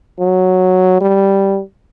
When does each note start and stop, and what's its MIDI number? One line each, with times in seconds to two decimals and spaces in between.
0.19 0.96 54
1.01 1.61 55